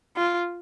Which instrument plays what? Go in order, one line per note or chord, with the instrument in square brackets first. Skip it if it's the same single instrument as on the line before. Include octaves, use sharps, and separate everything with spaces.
[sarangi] F4